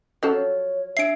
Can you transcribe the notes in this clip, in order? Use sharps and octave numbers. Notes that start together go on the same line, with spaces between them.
F3 F#3 C#4 A4
C#5
D4 E5 C7 D7